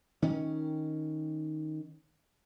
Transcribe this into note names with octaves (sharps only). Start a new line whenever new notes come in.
D#3 C#4